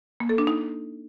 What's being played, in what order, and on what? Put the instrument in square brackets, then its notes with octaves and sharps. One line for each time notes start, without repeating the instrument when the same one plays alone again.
[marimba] A#3
A4
D4
D#4